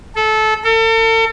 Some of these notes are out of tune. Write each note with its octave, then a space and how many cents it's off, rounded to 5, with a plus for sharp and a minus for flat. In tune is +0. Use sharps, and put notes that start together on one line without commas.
A4 -20
A4 +40